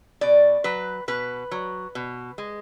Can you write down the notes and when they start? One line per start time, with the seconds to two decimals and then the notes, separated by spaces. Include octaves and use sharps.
0.21 B2 D5
0.64 F#3 B4
1.08 B2 B4
1.51 F#3
1.95 B2
2.38 G#3